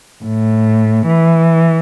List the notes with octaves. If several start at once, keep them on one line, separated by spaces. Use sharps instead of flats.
A2
E3